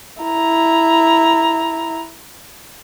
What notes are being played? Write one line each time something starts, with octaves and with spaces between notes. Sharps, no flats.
E4 A#5